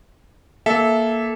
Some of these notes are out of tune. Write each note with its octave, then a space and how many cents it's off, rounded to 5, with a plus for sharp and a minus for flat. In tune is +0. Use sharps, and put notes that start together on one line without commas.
A#3 +0 A4 -20 E5 +0